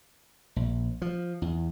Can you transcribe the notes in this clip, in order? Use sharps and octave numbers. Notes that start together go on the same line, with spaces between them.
A#1
F3
E2